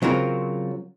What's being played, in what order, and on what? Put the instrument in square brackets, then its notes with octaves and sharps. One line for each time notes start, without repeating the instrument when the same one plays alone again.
[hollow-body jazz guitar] C#3 F#3 C4 F4 A#4